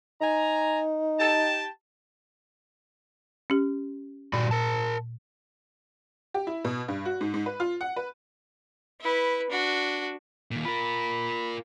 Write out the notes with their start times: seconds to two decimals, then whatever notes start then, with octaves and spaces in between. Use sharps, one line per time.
0.21 D#4 G#5 A#5
1.19 G4 G5 A5
3.50 C#4 G4
4.33 G2 A#2 F#4 D5
4.51 A#4 A5
6.34 G4
6.47 E4
6.65 B2
6.88 G2
7.05 F#4
7.21 G#2
7.34 G#2
7.46 B4
7.60 F4
7.81 F#5
7.96 B4
9.01 E4 B4
9.50 D4 F#4
10.51 D#2 A#2
10.65 F4 A#4 B5